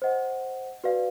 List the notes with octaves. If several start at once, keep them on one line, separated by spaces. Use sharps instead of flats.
C5 D#5 F#5
F#4 B4 D5 F5